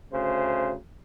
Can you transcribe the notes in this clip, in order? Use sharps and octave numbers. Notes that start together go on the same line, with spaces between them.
D2 C#3 C5